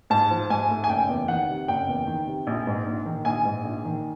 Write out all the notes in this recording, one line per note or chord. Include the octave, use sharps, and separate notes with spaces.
G#2 A5
F3
G#2 G#5
A3
G#5
F#1 G5
E2
D#3 F#5
C3
F#1 G5
E2
D#3
C3
A#1
G#2
A#1
D#3
A#1 G#5
G#2
A#1
D#3